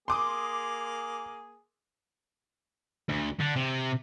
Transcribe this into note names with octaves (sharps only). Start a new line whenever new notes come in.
A#3 G#4 C6 D6 D#6
D2
D3
C3